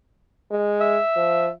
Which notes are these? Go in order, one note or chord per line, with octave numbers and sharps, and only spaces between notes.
G#3
E5
F3